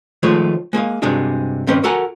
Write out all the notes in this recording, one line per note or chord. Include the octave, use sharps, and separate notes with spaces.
D#3 F3 G#3 A3 B4 C#5
G#3 A#3 D#5 F5
G2 C3 G#3 D4 F#4 G#4
G2 D#3 C4 C#4 B4 D#5
F#4 A4 A#4 F#5 G#5 A#5